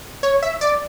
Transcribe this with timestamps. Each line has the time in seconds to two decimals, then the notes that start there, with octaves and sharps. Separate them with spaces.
0.23 C#5
0.42 E5
0.61 D5